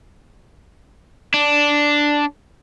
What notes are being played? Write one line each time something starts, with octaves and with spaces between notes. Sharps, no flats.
D4